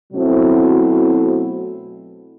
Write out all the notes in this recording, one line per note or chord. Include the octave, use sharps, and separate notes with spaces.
B2 F#3 A3 C4 E4